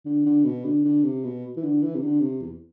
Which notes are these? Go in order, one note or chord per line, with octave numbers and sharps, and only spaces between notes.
D3
D3
B2
D3
D3
C3
B2
E3
D3
E3
C3
D3
C3
E2